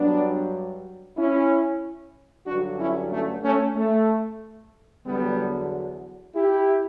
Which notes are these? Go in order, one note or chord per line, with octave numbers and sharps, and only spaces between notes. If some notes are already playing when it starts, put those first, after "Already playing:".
Already playing: G2 F#3 B3 D4
C#4 E4
G2 D3 F#3 D4 F#4
C#4 E4
A3 C#4
A3 C#4
A3
E2 D3 F#3 G3 B3
E4 G4